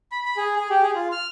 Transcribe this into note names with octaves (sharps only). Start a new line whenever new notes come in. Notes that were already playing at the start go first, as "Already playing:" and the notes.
B5
B5
G#4
G#4
G4
G#4
F4
F6